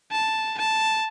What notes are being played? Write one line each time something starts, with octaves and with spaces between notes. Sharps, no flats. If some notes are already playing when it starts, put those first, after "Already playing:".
A5
A5